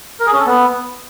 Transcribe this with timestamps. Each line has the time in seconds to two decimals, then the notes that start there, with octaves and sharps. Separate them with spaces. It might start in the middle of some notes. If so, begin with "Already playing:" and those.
0.20 A#4
0.26 G#4
0.33 C#4
0.40 A4
0.46 B3